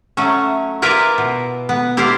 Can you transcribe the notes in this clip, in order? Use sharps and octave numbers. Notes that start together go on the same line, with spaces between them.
F#3 A3 C#4
E4 F4 A#4 B4 D5 E5
B2
B3
E4 G4 C5 D5 F5